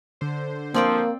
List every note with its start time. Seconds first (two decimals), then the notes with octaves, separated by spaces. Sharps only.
0.21 D3 C5
0.74 F3 A#3 C4 D5 G5